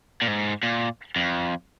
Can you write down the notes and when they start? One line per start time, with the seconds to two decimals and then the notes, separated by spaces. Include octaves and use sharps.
0.22 A#2
0.28 G#2
0.63 A#2
1.16 F2